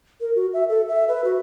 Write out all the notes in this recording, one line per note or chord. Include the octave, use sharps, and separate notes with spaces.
A#4
F#4
E5
A4
E5
B4
F#4